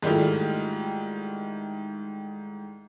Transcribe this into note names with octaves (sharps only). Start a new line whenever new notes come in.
G#2 D#3 G3 A3 E4 F4